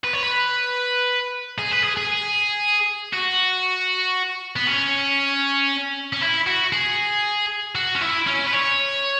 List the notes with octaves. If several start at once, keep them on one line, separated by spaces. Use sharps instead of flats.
B4
C#5
B4
G#4
B4
G#4
G#4
F#4
B3
C#4
C#4
E4
F#4
G#4
F#4
C#4
E4
C#4
B4
C#5